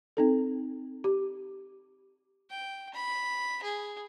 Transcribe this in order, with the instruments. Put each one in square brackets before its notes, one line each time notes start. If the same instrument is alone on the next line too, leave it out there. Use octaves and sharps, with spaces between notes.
[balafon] C4 D#4 A4
G4
[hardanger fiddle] G5
B5
G#4